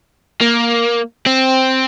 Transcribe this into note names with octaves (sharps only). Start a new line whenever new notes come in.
A#3
C4